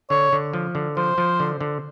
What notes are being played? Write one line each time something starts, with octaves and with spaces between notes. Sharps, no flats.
D3 C#5
D3
F3
D3
F3 C5
F3
D3
D3